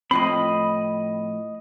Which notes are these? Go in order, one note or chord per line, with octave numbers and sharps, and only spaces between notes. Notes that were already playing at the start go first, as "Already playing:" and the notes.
A2 F3 C4 D#5 B5